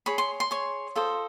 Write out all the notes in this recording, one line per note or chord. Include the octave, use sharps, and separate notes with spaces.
G#4 C#5 B5
C6
C6
G#4 C#5
F4 A4 C5 D#5